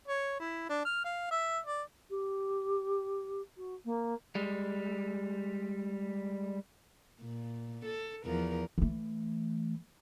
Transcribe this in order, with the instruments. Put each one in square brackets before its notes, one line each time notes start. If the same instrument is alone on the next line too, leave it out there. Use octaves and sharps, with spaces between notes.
[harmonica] C#5
E4
D4
F6
F5
E5
D5
[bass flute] G4
F#4
A#3
[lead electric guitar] G3 G#3
[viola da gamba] A#2
A4
E2 F3 A#4
[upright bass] E3 A3